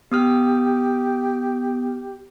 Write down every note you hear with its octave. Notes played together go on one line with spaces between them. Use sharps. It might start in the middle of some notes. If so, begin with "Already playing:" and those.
B3 G4 D#6 F6